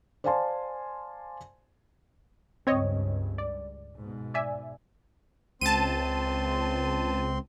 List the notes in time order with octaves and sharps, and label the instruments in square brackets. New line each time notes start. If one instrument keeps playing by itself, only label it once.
[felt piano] C5 D5 F5 G#5 A5 C6
[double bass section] C#2 G2 [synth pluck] C4 C#5 D#5
[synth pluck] D5
[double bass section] G#2 B2
[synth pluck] D5 E5 G#5
[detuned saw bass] C#2 [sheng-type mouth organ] C4 C6 [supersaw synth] A5 D#7